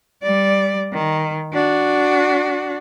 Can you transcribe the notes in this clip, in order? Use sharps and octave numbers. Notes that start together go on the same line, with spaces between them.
G3 D5
D#3
D4 F#4